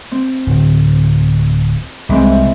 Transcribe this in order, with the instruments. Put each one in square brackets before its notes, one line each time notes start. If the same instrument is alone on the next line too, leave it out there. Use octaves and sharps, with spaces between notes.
[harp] C4
[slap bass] D1
[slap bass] C2 [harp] E3 G#3 C4